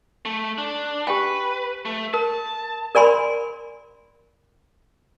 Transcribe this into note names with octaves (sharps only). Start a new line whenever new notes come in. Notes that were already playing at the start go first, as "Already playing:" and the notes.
A3
D4
G4 B4 G5 G#5
A3
A#4 A5
A#4 D5 G#5 B5 C6